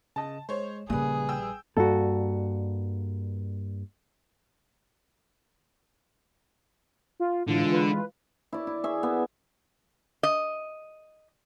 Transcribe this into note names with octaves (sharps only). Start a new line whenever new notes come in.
C#3 D#5 A5
G#3 C5 C#5
A#1 C#3 G3 A#3 G#4 B4 D#6
G5 E6
G2 G3 A#3 F#4 A4
F4
A2 D3 E3 G#3 F4
B4
E4 D5
E4
G#4 E5
B3
D#5